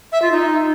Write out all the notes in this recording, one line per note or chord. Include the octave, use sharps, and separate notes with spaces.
E5
F4
D#4